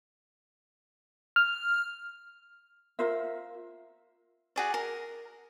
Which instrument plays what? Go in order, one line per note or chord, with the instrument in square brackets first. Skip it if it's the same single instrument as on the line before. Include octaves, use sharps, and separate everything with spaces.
[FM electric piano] F6
[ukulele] F4 A#4 C5 E5
[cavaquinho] F#4 G#4 D5
A#4